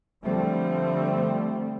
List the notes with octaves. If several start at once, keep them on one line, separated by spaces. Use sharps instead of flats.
D3 F3 G3 A3 C4